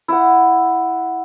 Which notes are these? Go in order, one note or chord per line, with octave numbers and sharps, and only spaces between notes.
E4 F#5